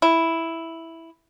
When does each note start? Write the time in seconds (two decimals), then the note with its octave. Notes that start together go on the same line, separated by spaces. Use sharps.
0.02 E4